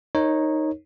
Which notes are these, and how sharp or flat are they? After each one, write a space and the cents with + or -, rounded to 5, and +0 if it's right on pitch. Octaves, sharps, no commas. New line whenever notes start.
D#4 +0 A#4 +0 C#5 -20